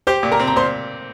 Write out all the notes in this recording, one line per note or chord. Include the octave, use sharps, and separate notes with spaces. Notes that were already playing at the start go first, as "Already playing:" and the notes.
G4 C5 C6
A#2
A#4 A#5
C4
A#5
A#2 C5 C6